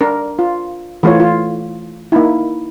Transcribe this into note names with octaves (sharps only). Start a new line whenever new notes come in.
D4 A#4
F4
E3 A3 F4 C#5
F4
A#3 D#4 E4